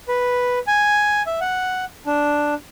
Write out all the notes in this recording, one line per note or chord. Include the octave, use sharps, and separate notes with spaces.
B4
G#5
E5
F#5
D4